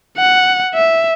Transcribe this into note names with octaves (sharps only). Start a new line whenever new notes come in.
F#5
E5